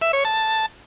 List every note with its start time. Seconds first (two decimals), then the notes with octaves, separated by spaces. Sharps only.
0.02 E5
0.13 C#5
0.25 A5